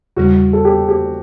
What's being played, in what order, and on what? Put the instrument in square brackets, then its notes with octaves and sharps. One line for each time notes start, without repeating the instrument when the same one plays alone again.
[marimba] E2 C#3 G3 [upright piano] F#4
[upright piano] A4
G4
G4